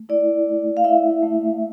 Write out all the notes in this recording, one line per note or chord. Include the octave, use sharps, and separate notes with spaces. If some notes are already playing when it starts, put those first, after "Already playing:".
Already playing: A3
E4 D5
A3
F5
E4 E5
A3